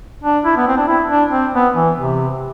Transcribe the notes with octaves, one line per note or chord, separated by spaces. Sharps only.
D4
E4
B3
C4
D4
E4
D4
C4
B3
E3
C3